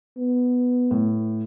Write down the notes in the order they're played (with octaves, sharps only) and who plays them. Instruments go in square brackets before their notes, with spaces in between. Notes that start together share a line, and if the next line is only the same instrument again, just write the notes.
[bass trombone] B3
[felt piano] A2